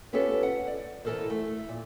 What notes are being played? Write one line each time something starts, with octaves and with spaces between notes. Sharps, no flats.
B3 C#4 F4 G4 A4 B4
F#5
D5
B2 E3 D4 A4 A#4 C5
A3
A#2